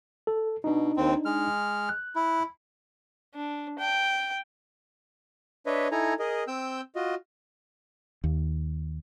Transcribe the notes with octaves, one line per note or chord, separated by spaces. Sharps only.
A4
B2 D4 D#4
D#2 C4
G#3 F6
F#6
E4
D4
G5
D4 B4 C#5 D#5 E5
D#4 E4 A4 G#5 A#5
G#4 A#4 D#5
C4 G5 E6 G6
F4 F#4 D#5
D#2